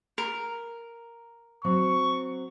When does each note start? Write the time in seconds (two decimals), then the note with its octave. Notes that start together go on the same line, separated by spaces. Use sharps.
0.18 A#4
1.65 F#3 C4 C#6